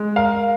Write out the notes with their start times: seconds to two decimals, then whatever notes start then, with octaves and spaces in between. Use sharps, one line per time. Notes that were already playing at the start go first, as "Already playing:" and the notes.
Already playing: G#3
0.16 A#4 F5